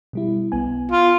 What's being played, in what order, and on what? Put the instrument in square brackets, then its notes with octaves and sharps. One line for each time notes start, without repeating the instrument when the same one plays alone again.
[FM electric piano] B2 G3 E4
B1 B3 G#5
[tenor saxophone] F4